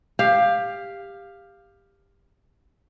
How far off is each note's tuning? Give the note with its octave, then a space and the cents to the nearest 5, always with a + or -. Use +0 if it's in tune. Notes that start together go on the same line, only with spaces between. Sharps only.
G4 +20 F5 +0